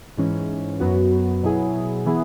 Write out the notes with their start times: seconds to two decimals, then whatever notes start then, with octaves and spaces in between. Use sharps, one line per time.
0.17 G#2 E3 C#4
0.80 F#2 F#3 B3 F#4
1.43 B2 F#3 E4 G#4
2.05 E3 B3 E4 G#4